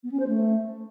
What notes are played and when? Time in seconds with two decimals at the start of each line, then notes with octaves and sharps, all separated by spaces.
0.03 B3
0.12 C#4
0.20 C5
0.28 A3